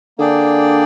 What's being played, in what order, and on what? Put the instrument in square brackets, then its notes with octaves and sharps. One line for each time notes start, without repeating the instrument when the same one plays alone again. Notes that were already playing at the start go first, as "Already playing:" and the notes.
[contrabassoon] D3 [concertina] A#3 D4 G#4 D5 G5